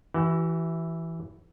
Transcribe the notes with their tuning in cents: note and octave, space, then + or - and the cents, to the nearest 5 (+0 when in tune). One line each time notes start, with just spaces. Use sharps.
E3 +0 F#4 +45